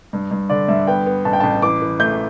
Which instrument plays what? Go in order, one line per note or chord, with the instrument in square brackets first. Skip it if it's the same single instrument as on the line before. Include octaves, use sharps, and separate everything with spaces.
[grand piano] G2
G2
[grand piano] D3 [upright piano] D5
[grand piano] G2 [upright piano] E5
[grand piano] B3 [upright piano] G5
[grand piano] B3
[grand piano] A1 [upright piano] A5
[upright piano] G5
A5
[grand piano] A1
[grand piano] E3 [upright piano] D6
[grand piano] E3
[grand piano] A3 [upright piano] G6